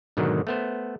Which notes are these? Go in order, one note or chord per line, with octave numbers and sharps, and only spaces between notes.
G#2 B2 D3 D#3 F#3
A3 B3 C5